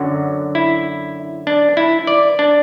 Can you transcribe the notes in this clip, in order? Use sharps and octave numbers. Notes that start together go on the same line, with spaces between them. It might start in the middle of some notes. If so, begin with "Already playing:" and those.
Already playing: F#2 D3 F#3 F#4
E4
D4
E4
D5
D4